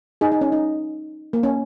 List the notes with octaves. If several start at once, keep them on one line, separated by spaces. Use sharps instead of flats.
D#4 G#4
D#4
C#4
D#4
A#3
C#4